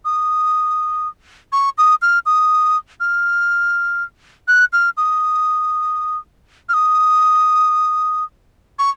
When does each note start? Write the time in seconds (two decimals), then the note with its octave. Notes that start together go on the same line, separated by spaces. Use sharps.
0.05 D#6
1.52 C#6
1.78 D#6
2.02 F6
2.26 D#6
3.00 F6
4.48 F#6
4.73 F6
4.97 D#6
6.69 F6
6.73 D#6
8.79 C#6